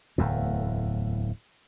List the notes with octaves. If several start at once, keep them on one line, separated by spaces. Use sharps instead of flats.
D1 E2 A2